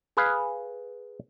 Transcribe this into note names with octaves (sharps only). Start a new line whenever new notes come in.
G#4 B4 F5